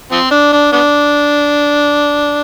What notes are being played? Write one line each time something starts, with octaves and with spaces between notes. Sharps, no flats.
F3 C4
D4
D4
B3 D4